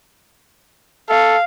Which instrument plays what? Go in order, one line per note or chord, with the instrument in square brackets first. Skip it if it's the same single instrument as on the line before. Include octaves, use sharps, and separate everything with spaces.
[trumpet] A4 [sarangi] F5